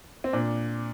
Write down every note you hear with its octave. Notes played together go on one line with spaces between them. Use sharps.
C4
A#2 D4